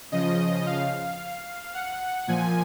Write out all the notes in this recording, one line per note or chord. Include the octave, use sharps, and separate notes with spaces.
C#3 F3 D#5
F5
F#5
A#2 F3 G#5